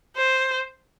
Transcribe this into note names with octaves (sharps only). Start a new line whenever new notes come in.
C5